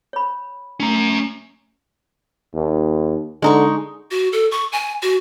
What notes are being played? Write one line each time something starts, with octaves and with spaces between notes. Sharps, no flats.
C#5 B5
A3 C#4 A#5
D#2
D3 G#3 D#4 C#6
F#4
A4
C#6
G#5
F#4